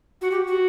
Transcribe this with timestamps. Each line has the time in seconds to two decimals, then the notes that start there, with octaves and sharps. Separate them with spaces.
0.22 F#4
0.31 G4
0.47 F#4